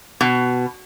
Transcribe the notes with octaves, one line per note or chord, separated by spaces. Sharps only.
B2